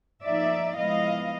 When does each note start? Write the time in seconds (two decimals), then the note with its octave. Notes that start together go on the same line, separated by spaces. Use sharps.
0.22 F3 A#3 D#4 D5 E5
0.76 F3 G#3 B3 E4 D#5 F5